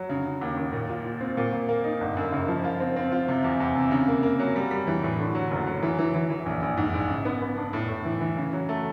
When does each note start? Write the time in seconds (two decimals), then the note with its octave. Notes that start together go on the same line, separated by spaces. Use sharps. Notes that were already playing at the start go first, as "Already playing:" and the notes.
Already playing: F#3
0.09 C#3
0.25 C#3
0.41 D#2
0.57 D#2
0.73 A#2
0.90 F4
1.05 F4
1.21 C4
1.37 A#2
1.53 A#2
1.68 A#3
1.84 D#4
2.01 G1
2.17 F#2
2.32 C#3
2.48 F3
2.64 F4
2.80 C4
2.96 C4
3.12 F4
3.28 C3
3.44 E2
3.60 E2
3.76 C3
3.91 C#3
4.08 A#3
4.23 A#3
4.39 F#3
4.56 G3
4.71 G3
4.87 E3
5.03 A2
5.19 D3
5.35 F#3
5.51 F#1
5.67 F#3
5.83 E3
5.98 E3
6.14 E3
6.30 E3
6.46 A#1
6.62 A#1
6.77 G#2
6.94 A#1
7.09 C#3
7.25 B3
7.42 B3
7.57 D4
7.73 A2
7.89 A2
8.05 E3
8.21 E3
8.37 C#3
8.53 F#3
8.69 A3